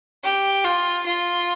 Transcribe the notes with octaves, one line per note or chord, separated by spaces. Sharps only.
G4
F4
F4